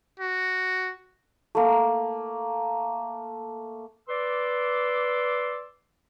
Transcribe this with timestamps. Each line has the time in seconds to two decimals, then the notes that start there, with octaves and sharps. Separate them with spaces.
0.20 F#4
1.55 A3 A#3
4.09 B4 D5 C6 D6 E6